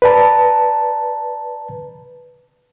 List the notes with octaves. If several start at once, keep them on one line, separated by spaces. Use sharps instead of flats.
B4 D5 A5 A#5